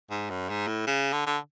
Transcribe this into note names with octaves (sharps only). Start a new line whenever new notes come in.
G#2
F#2
G#2
A2
C#3
D3
D3